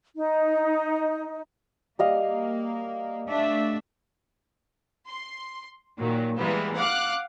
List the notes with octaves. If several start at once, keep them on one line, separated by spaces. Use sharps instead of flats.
D#4
G3 A#3 D#5 F5
A3 D4 E5
C6
A#2 D#3 F#3
E3 G3 G#3 A#3 B3
F5 F#5 D6 F6 F#6